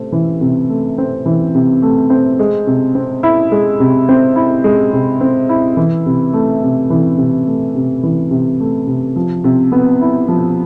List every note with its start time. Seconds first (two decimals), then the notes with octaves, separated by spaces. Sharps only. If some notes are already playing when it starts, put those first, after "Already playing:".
Already playing: C3 A3 C4
0.12 E3
0.41 C3
0.69 A3
0.98 C4
1.26 E3
1.55 C3
1.82 A3
2.10 C4
2.39 G#3
2.67 C3
2.95 C4
3.23 E4
3.52 G#3
3.80 C3
4.09 C4
4.36 E4
4.64 G#3
4.93 C3
5.21 C4
5.49 E4
5.77 E3
6.06 C3
6.33 A3
6.63 C3
6.90 E3
7.18 C3
7.47 A3
7.75 C3
8.03 E3
8.31 C3
8.60 A3
8.87 C3
9.16 F3
9.44 C3
9.72 B3
10.01 E4
10.28 F3